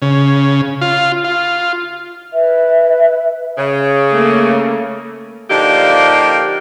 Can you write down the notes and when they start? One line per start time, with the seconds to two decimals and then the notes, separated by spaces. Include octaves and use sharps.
0.02 C#3
0.81 F4
1.24 F4
2.32 B4 E5
3.58 C#3
4.12 A3 A#3
5.50 D3 F3 A#3 D4 D#4 G4